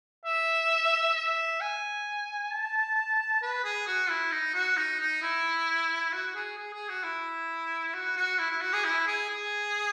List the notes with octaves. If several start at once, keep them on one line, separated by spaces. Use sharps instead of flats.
E5
E5
G#5
A5
B4
G#4
F#4
E4
D#4
F#4
D#4
D#4
E4
F#4
G#4
G#4
G#4
F#4
E4
F#4
F#4
E4
E4
F#4
G#4
E4
G#4
G#4